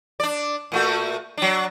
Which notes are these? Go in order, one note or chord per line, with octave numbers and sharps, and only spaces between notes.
D4 D5
A#2 A3 F#4
F#3 D4